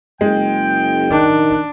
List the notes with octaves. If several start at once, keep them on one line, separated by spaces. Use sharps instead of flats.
F#1 G#3 G5
D#3 D4